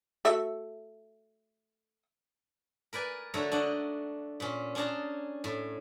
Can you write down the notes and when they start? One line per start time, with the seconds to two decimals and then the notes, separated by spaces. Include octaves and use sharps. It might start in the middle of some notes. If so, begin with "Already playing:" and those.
0.25 A3 F#4 E5
2.93 A#4 B4 D5 G#5
3.34 D3 A3 F#4 A4 C#5 A#5
3.52 D4 D#5 F#5
4.40 A#2 C#4
4.75 C#4 D4 G#4 C#5 A5 A#5
5.44 A2